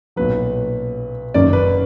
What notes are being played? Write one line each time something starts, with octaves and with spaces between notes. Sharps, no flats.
B1 A#2 F#3 B4
F#1 F#2 D#3 D5
B4